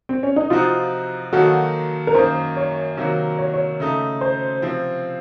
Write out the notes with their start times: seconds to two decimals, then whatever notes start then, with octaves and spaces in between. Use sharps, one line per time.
0.09 C4
0.23 C#4
0.36 D#4
0.50 C3 F3 C4 D#4 F4 F#4
1.33 D#3 F#3 A#3 D#4 F#4 A4
2.07 A#4
2.14 F#2 D#3 A#3 D#4 C5
2.57 C#5
2.97 C3 D#3 F#3 A#3
3.38 C#5
3.54 C#5
3.80 C#3 A3 D#4 A4
4.21 C5
4.62 C3 F3 C4